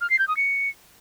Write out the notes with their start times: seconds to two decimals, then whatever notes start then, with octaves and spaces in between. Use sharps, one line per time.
0.01 F6
0.10 C7
0.19 G6
0.28 D#6
0.37 C#7